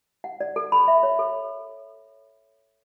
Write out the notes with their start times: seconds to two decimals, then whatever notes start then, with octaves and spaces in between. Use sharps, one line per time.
0.24 F#5
0.41 D5
0.56 A4
0.72 B5
0.88 E5
1.03 C#5
1.19 A4